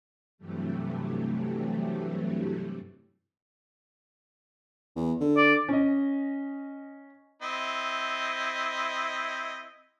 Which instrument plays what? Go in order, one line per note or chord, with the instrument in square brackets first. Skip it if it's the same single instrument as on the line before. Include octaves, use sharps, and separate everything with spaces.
[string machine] G2 C3 E3 F#3 G3 A3
[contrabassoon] E2
D3
[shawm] D5
[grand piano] C#4 D#5
[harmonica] C4 E4 D#5